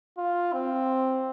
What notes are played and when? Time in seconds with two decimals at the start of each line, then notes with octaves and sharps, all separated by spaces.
0.18 F4
0.53 C4